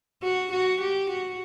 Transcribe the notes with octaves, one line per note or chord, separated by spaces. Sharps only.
F#4
F#4
G4
F#4